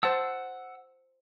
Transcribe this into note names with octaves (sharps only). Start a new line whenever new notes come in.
C5 F#5 A5 E6